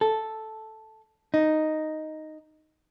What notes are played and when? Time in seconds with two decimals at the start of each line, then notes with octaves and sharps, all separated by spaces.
0.01 A4
1.34 D#4